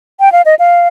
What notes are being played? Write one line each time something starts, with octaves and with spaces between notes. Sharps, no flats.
G5
F5
D#5
F5